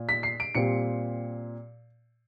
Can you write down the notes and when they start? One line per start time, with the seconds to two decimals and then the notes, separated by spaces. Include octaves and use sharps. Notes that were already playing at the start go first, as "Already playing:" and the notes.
Already playing: A#2
0.09 B6
0.23 C7
0.40 D7
0.55 A#2 G3 C4 C#7